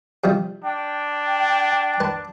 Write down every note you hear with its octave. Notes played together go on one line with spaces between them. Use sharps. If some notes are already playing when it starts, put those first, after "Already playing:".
C3 F3 G3
D4 G5
B4 A5